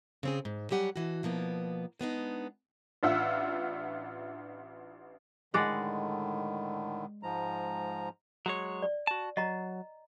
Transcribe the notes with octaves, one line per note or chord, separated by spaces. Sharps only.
C#3 C4 G#4
G#2
F#3 G3 G4 F#5 G#5
B2 E3 F#4
B2 F3 A#3 B3
G#3 B3 D4 D#4
A1 D4 F4 E5 F#5 E6
A2 D3 D#3 G#3 D5 F#5
G#2 F3 A#5
F#3 G#3 C#5
D5
F#4 A5
F#3 D#5 A#5